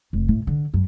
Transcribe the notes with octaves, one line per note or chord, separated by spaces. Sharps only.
F1
A2
D3
F#2